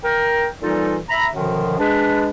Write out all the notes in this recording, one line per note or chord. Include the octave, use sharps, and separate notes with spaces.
A#4 G5
A#2 E3 G3 D#4 F4 A4
E5 A#5 B5
F#2 B2 D3 D#3 F3
G#3 D4 B4